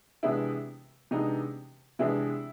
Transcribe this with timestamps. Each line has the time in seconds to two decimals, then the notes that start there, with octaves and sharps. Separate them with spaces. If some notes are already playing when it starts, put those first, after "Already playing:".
0.23 C3 E3 G#3 B3 D4 E4
1.11 C3 E3 G#3 B3 D4 D#4
1.99 C3 E3 G#3 B3 D4 E4